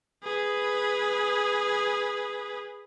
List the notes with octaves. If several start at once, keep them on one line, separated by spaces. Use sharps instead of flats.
G#4 B4